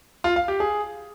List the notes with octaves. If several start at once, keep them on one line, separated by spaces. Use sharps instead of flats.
F4
F5
G4
G#4